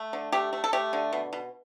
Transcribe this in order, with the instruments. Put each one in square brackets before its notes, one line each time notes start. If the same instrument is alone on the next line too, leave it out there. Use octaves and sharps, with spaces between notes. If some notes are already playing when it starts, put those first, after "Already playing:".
Already playing: [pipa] A3
D3
A3 G4
A3
A4
A3 G4
D3
B2
B2